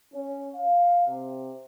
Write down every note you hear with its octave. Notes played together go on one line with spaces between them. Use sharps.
C#4
F5
C3